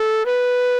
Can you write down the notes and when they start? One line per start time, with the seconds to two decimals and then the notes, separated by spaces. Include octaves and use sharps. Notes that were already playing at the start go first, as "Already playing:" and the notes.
Already playing: A4
0.26 B4